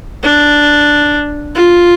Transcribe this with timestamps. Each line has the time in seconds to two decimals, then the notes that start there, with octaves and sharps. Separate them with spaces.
0.23 D4
1.56 F4